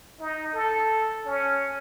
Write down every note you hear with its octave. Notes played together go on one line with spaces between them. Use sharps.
D#4
A4
C#4